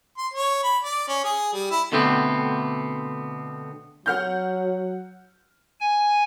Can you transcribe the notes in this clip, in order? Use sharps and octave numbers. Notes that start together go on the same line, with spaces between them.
C6
C#5
B5
D5
C#4
G#4
G3
E4
B2 D3 A3 B3 C4
F#3 F#5 F6 G6
G#5